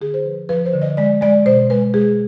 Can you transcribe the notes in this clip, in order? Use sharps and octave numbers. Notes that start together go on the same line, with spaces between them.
D3 G#4
C5
F3 B4
F3 B4
C5
D3
D#5
G#3 D5
G#3 D5
B2 C5
G#3 B4
G#3 G#4